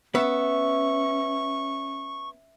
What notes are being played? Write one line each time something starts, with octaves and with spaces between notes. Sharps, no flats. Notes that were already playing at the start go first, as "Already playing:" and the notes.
B3 C#4 E5 C#6